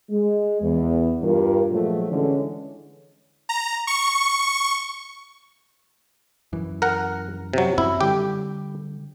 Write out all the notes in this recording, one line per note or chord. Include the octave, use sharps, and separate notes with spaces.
G#3
E2
G2 F4 A#4
A#2 F3 F#3 G#3 A3
D3 E3 G#3 C#4
A#5
C#6
F#2 E3
A#4 F#5
C3 F#3
F#2 C4 E4
D3 G3 G4 G5